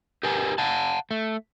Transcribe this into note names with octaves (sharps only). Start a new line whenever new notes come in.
G4 A#4 B4 G#5
F5 F#5 A5
A3